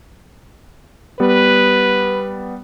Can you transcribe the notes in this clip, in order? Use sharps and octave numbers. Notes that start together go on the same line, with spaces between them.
G3 B3 B4